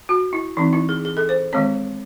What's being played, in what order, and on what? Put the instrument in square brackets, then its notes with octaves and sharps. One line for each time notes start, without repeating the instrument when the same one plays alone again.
[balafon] F#4
E4
E3 C4 D#4
E4
G#4
G#4
A4
C5
D#3 G#3 C4 C#5